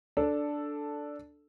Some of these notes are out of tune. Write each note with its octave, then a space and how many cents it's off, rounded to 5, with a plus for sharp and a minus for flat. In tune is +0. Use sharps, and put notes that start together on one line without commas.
D4 +0 A4 +0